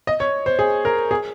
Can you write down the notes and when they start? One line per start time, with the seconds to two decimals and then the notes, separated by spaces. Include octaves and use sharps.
0.07 D#5
0.20 C#5
0.46 C5
0.59 G#4
0.85 A#4
1.11 G#4